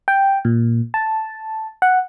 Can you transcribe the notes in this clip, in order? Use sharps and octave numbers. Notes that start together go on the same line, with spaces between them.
G5
A#2
A5
F#5